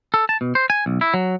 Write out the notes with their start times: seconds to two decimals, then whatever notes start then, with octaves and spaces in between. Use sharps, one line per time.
0.14 A4
0.29 A5
0.41 B2
0.55 C5
0.70 G#5
0.86 B1
1.01 E4
1.14 F#3